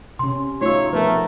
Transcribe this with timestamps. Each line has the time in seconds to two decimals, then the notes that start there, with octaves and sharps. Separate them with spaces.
0.19 C3 C#4 C6
0.62 A3 D#4 F4 F#4 C#5 E6
0.93 F3 A3 B3 A#4 B4